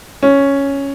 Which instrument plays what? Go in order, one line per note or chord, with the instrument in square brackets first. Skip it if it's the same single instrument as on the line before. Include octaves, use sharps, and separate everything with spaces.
[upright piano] C#4